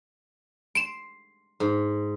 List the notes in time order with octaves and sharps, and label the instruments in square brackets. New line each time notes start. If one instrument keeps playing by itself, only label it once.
[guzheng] C6 [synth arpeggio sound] D7 E7
[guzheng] G#2